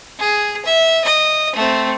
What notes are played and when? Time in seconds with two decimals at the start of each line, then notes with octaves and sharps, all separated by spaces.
0.19 G#4
0.66 E5
1.05 D#5
1.56 A3 C4